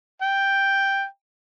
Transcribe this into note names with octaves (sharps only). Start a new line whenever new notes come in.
G5